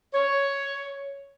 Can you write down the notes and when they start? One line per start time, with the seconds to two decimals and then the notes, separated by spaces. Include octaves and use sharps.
0.14 C#5